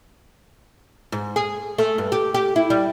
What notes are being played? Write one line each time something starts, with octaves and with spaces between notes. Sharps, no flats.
G#2
G#4
A3
G2
G4
G4
E4
G3